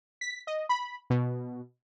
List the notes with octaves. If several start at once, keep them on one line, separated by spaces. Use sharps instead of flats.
B6
D#5
B5
B2